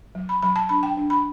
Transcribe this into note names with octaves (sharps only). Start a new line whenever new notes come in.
F#3
B5
F#3 B5
A5
D4 B5
G5
D4
B5